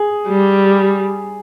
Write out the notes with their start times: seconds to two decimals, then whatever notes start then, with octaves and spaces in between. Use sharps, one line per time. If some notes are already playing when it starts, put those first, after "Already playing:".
Already playing: G#4
0.28 G3